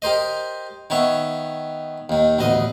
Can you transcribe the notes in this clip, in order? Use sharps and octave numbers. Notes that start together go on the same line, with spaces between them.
G4 A#4 C5 D#5
D#3 B3 C#5 E5
D#2 D#3
A1 D2 B3 D#5